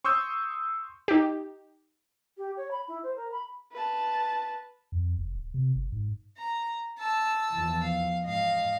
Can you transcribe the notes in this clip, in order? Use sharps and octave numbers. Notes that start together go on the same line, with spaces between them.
C6 C#6 D#6 E6 G6
D#4 G4
G4
C#5
B5
E4
C5
A#4
B5
B4 A5
F2
F1
D1
C3
G1
G#2
A#5
A5 E6
E2 E3 F3
F5
G#2 D#5 F5